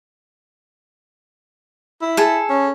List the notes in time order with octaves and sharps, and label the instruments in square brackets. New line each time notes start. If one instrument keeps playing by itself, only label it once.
[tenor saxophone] E4
[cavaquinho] G#4 A4
[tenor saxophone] C#4